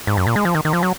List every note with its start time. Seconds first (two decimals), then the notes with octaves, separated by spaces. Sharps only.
0.07 G#2
0.17 F#2
0.27 A#2
0.36 G#3
0.45 F3
0.55 D#3
0.65 D#3
0.73 F3
0.83 F#3